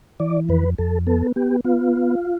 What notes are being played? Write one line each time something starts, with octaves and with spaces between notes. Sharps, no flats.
E3 D5
F2 B4
F2 A4
B3 A4
B3 G4
B3 F4